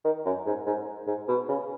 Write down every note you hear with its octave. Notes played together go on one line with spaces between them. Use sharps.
D#3
F#2
G#2
G#2
G#2
B2
C#3